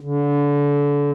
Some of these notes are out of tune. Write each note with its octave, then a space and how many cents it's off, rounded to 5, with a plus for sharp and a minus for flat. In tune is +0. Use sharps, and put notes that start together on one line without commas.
D3 -30